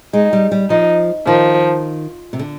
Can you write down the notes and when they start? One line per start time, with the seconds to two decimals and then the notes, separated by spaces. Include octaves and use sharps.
0.13 G#3 D#4
0.33 G3
0.52 G3
0.70 F3 D#4
1.26 D#3 F3
2.33 C3
2.39 D3